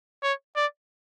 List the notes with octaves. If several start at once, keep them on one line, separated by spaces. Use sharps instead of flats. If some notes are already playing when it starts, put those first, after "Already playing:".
C#5
D5